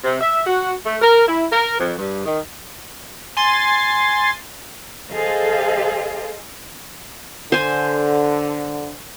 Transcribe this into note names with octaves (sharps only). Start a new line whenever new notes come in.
C3
E5
F#4
A3
A#4
E4
A#4
F2
G2
D#3
G#5 C6 A6
G#4 A4 C5 D#5 F5
D3 C5 G#5